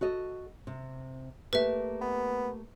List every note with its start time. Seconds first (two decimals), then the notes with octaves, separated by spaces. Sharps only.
0.01 F#4 A4 D#5
0.67 C3
1.53 A3 A#3 G4 B4 E5
2.01 B3